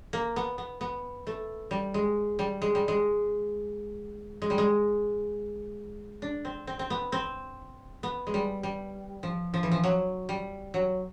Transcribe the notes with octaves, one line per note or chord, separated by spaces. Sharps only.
A#3
B3
B3
B3
A3
G3
G#3
G3
G#3
G3
G#3
G#3
G3
G#3
D4
C4
C4
C4
B3
C4
B3
G#3
G3
G3
F3
F3
E3
F3
F#3
G3
F#3